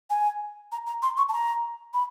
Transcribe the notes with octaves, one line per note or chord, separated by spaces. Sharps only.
G#5
A#5
A#5
C6
C#6
A5
A#5
B5